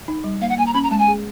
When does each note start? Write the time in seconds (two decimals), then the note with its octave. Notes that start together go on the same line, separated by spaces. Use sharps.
0.08 D#4
0.24 G3
0.41 A#3 F5
0.49 F#5
0.58 A#3 G#5
0.66 A#5
0.73 C#4 B5
0.83 A#5
0.90 G#3 A5
0.99 G#5
1.08 G#4